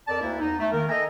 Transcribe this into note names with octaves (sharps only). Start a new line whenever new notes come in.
F2 A#4 D5 A5
D2 A#3 E4
E2 D#4
A3
D#3 A#3 A#4
A4 D#5 E5 G5 G#5 A#5